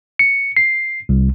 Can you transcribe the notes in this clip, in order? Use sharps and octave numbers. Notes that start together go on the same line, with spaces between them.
C#7
C7
C2